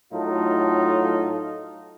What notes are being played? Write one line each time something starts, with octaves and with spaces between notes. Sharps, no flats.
A2 F#3 D#4 F4 A4